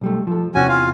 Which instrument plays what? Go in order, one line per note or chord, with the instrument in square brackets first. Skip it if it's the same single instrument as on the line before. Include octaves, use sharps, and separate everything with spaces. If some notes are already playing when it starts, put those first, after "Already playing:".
[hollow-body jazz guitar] B1 G3 A3
F3 A4
[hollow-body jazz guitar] E2 C3 E3 [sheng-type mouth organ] C#4 F#4 G#5
[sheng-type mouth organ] F4 F5